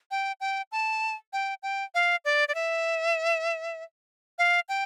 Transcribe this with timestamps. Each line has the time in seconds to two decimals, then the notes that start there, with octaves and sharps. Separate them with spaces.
0.11 G5
0.41 G5
0.72 A5
1.33 G5
1.63 G5
1.95 F5
2.25 D5
2.48 D5
2.55 E5
4.39 F5
4.69 G5